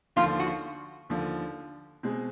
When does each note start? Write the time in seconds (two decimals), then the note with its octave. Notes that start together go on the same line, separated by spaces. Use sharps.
0.16 D#2 D3 F3 F4
0.40 F#4
1.10 D#2 D3 F3
2.03 B2 G#3 C4